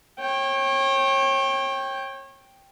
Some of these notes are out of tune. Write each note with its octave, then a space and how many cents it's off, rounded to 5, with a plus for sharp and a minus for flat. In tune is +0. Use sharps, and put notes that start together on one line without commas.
C#5 -30 G5 +5